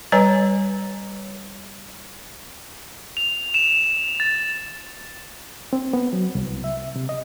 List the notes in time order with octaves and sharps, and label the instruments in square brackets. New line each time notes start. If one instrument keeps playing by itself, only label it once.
[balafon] G3 B4 C#5 G#5 A#5
[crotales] F7
E7
A6
[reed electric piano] C4
B3
F#3
C2
E5
C3
D#5